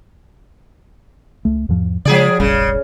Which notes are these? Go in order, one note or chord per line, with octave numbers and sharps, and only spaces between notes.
C#2 A3
E2 G#2 F3
C#3 F3 G#3 G#4 D5
E1 A1 C#3 G3